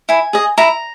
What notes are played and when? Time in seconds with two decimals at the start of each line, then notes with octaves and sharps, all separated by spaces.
0.09 E4 G#5
0.33 G#4 D#5
0.58 E4 A#5